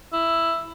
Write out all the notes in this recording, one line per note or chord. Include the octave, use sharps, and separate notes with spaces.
E4